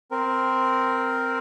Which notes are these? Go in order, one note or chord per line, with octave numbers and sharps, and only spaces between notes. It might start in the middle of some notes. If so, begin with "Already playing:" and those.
C4 A#4